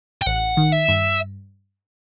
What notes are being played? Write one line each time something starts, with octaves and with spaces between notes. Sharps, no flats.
G5
A1 F#5
D#3
E5
G2